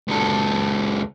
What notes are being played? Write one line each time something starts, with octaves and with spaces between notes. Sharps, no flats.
C#2 A4